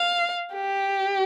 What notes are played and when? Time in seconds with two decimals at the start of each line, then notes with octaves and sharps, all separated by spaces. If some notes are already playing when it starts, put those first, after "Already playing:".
Already playing: F5
0.53 G4